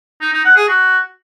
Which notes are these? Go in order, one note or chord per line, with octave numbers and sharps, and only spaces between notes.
D#4
D#4
F#5
G#4
F#4